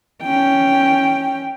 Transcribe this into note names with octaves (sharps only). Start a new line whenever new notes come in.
C#4 G5